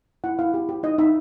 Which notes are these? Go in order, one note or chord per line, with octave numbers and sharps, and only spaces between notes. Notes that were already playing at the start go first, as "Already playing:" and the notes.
E4 F#5
E4 F5
G4
G4
D#4 D#5
D#4 E5